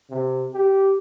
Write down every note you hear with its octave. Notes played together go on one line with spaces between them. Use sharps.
C3
G4